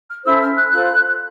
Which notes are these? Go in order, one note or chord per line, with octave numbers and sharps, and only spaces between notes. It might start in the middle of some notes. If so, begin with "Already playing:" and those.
F6
C#4 E4 A4 C5 E6
F6
F#6
F4 A4 C5 F#6